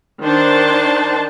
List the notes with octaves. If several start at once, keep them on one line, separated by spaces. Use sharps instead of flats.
D#3 D4 C5 A5